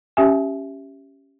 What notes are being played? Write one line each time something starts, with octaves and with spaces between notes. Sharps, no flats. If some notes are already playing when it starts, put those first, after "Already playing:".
C#4 G4 E5 G#5